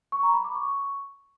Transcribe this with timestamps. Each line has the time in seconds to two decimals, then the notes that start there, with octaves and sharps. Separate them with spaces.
0.12 C#6
0.23 A#5
0.34 B5
0.44 D6
0.55 C#6